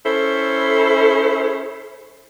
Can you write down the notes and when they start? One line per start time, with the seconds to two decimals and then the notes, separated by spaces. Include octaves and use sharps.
0.05 C#4 E4 A4 C5